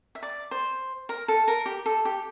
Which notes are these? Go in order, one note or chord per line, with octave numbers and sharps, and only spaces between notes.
E5
D5
C5
A#4
A4
A#4
G4
A4
G4